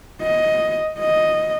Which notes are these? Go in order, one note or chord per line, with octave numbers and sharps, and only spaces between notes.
D#5
D#5